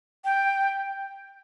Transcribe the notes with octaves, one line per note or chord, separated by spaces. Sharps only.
G5